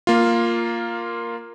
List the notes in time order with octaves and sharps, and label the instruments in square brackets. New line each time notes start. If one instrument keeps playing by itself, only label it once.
[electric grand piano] A#3 F4